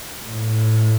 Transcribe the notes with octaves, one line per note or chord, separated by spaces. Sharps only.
A2